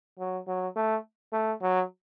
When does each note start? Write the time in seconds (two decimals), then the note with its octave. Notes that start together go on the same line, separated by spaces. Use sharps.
0.19 F#3
0.48 F#3
0.76 A3
1.33 A3
1.62 F#3